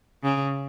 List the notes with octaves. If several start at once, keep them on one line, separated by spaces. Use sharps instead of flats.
C#3